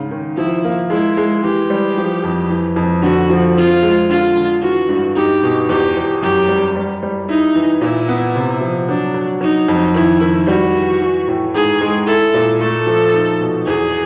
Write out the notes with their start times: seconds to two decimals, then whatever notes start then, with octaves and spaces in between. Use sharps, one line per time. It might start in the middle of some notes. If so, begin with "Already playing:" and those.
Already playing: G#2 C#3
0.11 D#3
0.37 F3 E4
0.65 A#3
0.90 G#3 E4
1.17 G#3
1.43 E3 G4
1.70 G3
1.98 F3
2.24 F2
2.50 E3
2.76 F2
3.03 D3 F#4
3.30 F3
3.56 C4 F4
3.83 G#3
4.10 D3 F4
4.36 D3
4.62 E3 F#4
4.89 G2
5.16 D#4 G4
5.43 B2
5.69 E2 G4
5.96 E2
6.23 F#2 G4
6.48 G3
6.76 G3
7.03 G3
7.29 D#4 E4
7.55 E3
7.81 A#2 E4
8.09 B3
8.35 C3
8.61 F3
8.89 F#3 D4
9.14 F#3
9.41 F#3 D#4
9.68 F2
9.94 D#3 E4
10.21 D#3
10.47 G3 F#4
10.74 E3
11.02 E3
11.28 A2
11.54 G#2 G#4
11.81 G#3
12.07 E4 A4
12.34 A#2
12.61 A3 A4
12.87 F3
13.14 D#4
13.41 B2
13.66 E2 G#4